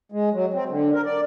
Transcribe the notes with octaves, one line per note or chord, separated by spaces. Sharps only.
G#3
F#3
C4
D3
A#4
D5